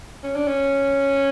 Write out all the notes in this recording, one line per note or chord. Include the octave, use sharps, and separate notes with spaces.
C#4
D4
C#4